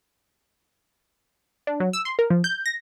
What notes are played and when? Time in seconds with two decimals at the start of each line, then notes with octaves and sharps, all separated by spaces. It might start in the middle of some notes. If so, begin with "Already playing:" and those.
1.67 D4
1.80 F#3
1.93 E6
2.05 C6
2.19 A#4
2.30 F3
2.44 G6
2.66 A#6